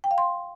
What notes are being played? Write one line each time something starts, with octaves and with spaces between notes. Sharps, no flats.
G5
F5
C6